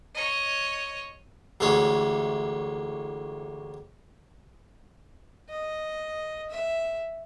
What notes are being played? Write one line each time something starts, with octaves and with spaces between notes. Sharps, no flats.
C#5 D#5
A1 D2 E3 G#3 C#5
D#5
E5